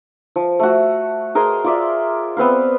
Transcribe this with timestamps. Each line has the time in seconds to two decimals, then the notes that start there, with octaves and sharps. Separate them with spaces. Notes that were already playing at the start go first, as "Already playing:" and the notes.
0.36 F3
0.60 A3 F#4
1.35 G#4 A#4 C5 D#5
1.64 F4 D5 E5
2.37 B3 C4 B4 F5